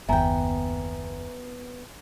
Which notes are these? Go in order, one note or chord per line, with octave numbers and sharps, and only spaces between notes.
F#1 D#2 B3 E5 G5 G#5 A#5